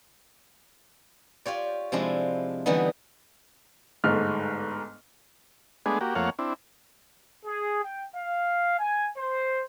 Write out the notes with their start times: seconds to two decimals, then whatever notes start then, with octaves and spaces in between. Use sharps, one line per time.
1.46 F4 G4 C#5 D5
1.92 C3 F3 G#3 D4 E4 F4
2.66 D3 E3 G3 A3 B3 D#4
4.04 G1 G#2 A3 F6
5.86 G#3 A3 B3 D4 G#4
6.01 A#3 F#4 G4
6.15 F2 A3 A#3 C#5 F5 F#5
6.39 C4 D4 E4
7.45 G#4
7.84 G5
8.15 F5
8.79 G#5
9.17 C5